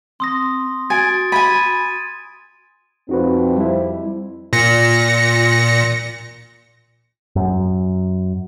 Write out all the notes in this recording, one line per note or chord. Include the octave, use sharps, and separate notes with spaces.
C4 C6 D#6 A#6
F#4 G#5 A6 D7
G#5 B5 G#6 A6 D#7
F2 C4 D#4 F#4 B4
G3 E4
A#2 A#6 C#7
F#2